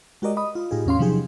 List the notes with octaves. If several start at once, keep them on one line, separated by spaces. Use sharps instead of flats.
G#3 F#4 G4 A#4 D5 D#5
D#5 B5 D#6
F4
A2 D#4 F4 G4 G#4
E2 A2 C#4 F5 C6
C3 F3 F#3 D#4 G4 G#4